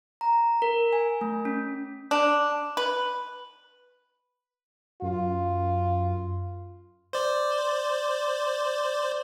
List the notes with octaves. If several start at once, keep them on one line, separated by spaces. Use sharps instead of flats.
A#5
A#4
G#5
A3
C#4
D4
B4
F#2 F4
C5 D5